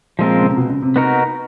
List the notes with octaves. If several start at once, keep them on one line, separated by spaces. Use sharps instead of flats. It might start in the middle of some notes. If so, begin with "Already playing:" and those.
A#2 F3 G#3 C4 F4 A#4
C#3
C3
B2
C#3
C3
B3 D#4 F#4 A#4